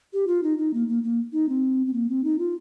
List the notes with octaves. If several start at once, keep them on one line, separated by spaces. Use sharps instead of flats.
G4
F4
D#4
D#4
A#3
A#3
A#3
D#4
C4
C4
A#3
C4
D#4
F4